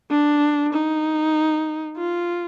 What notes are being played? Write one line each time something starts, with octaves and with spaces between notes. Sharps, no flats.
D4
D#4
F4